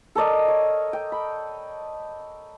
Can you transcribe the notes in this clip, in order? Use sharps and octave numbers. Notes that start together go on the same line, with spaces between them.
A4 A#4 D5 D#5
C#5
G5
B5